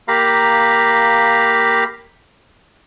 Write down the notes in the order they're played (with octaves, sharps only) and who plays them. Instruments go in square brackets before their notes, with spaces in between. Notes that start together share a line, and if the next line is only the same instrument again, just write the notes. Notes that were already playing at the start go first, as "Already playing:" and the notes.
[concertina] A#3 G4 F5 A#5 B5